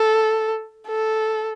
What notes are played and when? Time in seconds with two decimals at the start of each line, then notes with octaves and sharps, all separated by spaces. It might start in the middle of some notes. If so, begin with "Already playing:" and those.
Already playing: A4
0.88 A4